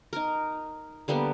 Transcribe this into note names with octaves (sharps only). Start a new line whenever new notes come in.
D#4 A#4
D3 G3 A#3 B3